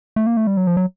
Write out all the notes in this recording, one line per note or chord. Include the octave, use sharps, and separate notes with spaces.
A3
A#3
A3
G3
F#3
F3
F#3